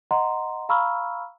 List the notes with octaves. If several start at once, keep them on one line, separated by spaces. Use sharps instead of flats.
D#5 F#5 A#5 C6
F5 A#5 B5 C#6 E6 F6